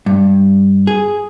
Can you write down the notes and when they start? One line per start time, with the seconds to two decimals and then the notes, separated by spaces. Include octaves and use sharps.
0.06 G2
0.87 G#4